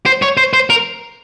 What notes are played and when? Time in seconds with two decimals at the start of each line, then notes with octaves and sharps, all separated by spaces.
0.06 C5
0.22 C#5
0.37 C5
0.53 C5
0.70 A#4